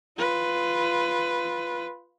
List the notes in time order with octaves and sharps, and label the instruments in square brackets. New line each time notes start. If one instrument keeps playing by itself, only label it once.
[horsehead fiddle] F4 B4